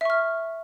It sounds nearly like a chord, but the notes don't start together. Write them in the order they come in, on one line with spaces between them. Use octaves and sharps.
E5 C#6 F6